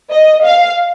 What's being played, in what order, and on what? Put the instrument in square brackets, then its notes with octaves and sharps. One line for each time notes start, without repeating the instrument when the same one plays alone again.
[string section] D#5
F5